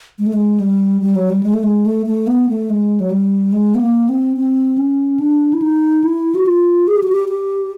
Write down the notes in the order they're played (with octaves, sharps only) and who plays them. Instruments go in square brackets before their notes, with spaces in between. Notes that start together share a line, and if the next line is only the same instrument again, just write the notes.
[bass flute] G#3
A3
G#3
G3
G3
F#3
G3
G#3
A3
G#3
A3
A3
B3
A3
G#3
F#3
G3
G#3
B3
A#3
C4
C4
C#4
D4
E4
D#4
E4
F#4
F4
G#4
G4
F#4
G4
G4